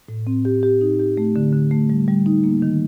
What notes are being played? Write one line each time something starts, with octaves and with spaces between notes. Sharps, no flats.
A2
C4
G4
G4
D#4
G4
A3
D3
D3
A3
G3
G3
D#4
A#3
D#3